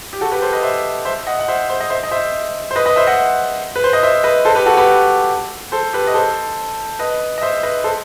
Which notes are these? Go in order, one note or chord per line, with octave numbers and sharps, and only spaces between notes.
G4
F#4 A4
G4 B4
A4 C5
B4 D#5
C5 E5
C5 E5
D#5 F#5
F#5
C5 E5
C5
D#5
C5 E5
D#5
C5 E5
C5
B4 D#5
B4 D#5
C5 E5
D#5 F#5
B4
C5
D#5
C5 E5
B4 D#5
A4 C5
G4 B4
F#4 A4
G4 B4
A4 C5
G4 B4
D#5
A4 C5
B4 D#5
D#5
C5 E5
B4 D#5
A4 C5